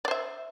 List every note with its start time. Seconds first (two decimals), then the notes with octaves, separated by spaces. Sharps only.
0.05 D5
0.08 C5
0.11 E5